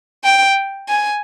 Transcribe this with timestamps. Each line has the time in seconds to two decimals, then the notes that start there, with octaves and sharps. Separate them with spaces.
0.24 G5
0.88 G#5